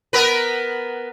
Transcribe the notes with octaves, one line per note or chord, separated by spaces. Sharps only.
B3 A#4 B4